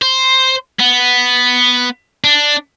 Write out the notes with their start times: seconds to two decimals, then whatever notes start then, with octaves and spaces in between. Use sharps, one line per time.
0.02 C5
0.80 B3
2.24 D4